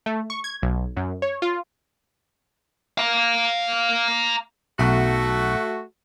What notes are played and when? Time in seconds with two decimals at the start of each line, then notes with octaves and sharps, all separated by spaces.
0.06 A3
0.30 C#6
0.44 G#6
0.62 B1
0.97 F#2
1.22 C#5
1.42 F4
2.98 F5 A#5
4.79 B1 A3 F#4